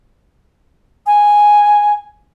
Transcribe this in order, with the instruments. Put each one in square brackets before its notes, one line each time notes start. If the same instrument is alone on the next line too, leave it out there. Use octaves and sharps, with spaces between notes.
[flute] G#5